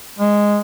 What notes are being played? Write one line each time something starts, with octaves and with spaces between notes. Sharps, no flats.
G#3